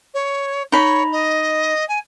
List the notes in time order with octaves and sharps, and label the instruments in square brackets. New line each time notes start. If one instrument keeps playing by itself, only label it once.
[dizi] C#5
[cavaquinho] D#4 B5 [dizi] C#5
[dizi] D#5
G#5